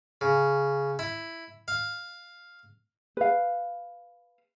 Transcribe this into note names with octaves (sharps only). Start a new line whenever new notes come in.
C#3
E4
F5
B4 F5